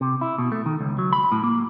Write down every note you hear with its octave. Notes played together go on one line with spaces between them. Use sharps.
C3
E4
B2
A3
D#3
C#2
F#3
B5
A2
A#3